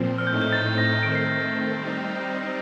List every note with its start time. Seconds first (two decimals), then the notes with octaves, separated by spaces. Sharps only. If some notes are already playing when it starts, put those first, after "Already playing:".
Already playing: A#2 F3 C4
0.18 F6
0.27 A2 A3 C4 D#4 G6
0.42 G6
0.53 A6
0.78 A#6
1.03 D#3 A3 C4 D7
1.15 C7
1.29 A#6
1.42 C7
1.77 G3 C4 D#4